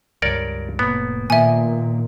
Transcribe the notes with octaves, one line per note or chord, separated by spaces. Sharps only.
C#2 G2 A#4 C#5 D5
F1 A2 A#3 B3
A#2 D#3 A#3 E5 G#5